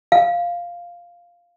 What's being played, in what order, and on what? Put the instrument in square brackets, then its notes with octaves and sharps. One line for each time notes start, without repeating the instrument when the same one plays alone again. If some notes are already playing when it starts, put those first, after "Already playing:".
[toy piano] F5